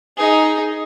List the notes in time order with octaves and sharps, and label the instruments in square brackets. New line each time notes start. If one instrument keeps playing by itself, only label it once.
[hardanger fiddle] D#4 G#4